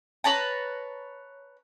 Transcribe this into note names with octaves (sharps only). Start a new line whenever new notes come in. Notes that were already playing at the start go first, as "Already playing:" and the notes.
B4 C#5 A5 A#5